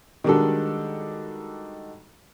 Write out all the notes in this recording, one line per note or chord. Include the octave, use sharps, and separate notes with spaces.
D#3 G3 G#3 D4 F#4 A4